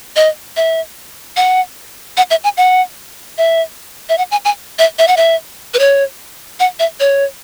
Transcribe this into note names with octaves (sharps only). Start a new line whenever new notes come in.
D#5
E5
F#5
F#5
E5
G#5
F#5
E5
E5
F#5
G#5
G#5
E5
E5
F#5
E5
B4
C#5
F#5
E5
C#5